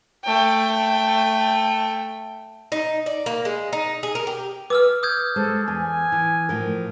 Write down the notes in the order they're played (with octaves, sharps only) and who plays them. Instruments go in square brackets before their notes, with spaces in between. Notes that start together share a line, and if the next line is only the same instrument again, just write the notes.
[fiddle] A3 G5
[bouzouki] D#4
D5
A#3
G#3
D#4
G#4
A#4
G4
[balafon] B4 [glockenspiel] D6 E6 F6
[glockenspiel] D#6 G6 G#6
[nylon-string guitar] G3 G#3 C5 [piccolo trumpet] A4
[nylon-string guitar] E2 [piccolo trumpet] G#5
[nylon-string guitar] E3
A2 F3 A#4